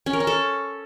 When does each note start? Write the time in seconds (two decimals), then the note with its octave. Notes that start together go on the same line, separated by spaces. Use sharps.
0.06 C#4
0.13 A#4
0.20 C#4
0.27 A4